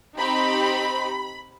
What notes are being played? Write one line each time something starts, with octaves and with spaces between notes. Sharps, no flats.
C4 D#4 G4 B5